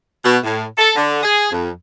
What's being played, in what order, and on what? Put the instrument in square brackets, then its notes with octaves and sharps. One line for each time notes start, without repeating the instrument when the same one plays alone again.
[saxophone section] B2
A2
A4
D3
G#4
F2